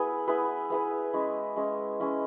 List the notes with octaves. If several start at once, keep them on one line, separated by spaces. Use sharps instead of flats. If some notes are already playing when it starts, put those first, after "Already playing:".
Already playing: B3 E4 G#4 B4
B3 E4 G#4 B4
B3 E4 G#4 B4
G#3 C#4 E4
G#3 C#4 E4
G#3 C#4 E4